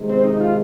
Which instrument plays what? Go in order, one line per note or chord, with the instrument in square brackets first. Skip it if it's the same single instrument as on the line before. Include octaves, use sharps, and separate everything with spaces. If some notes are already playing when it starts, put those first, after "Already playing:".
Already playing: [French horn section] C3 D#3 G#3
[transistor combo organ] C4
D#4
F4